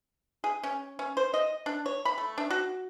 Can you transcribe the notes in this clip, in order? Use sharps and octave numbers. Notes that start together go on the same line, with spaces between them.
G#4
C#4
C#4
C5
D#5
D4
C#5
B5
A3
D4
F#4